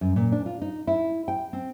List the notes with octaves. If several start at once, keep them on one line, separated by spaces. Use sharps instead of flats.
F#2
A#2
D4
F4
D#4
E4
G5
C4